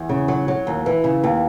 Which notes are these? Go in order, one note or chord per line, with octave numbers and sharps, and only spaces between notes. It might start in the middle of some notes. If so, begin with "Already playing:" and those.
Already playing: E2
C#3
F#3
F#3
D#2
E3
C#3
D#2